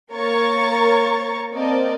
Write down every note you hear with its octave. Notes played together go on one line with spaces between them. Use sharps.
A#3 A#4 C#5 A#5 C#6 A6
A#3 C4 A#4 D5 D#5 A5